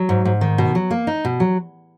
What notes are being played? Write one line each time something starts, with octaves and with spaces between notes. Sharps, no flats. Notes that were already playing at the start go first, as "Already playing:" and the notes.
Already playing: F#3
G#2
G#2
D#3
B2
F#3
A#3
D#4
B2
F#3